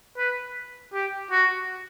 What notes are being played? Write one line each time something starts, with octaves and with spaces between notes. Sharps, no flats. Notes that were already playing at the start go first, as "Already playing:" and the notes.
B4
G4
F#4